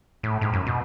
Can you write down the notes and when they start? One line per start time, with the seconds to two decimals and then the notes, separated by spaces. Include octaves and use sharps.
0.23 A2
0.41 G#2
0.53 F#2
0.67 B2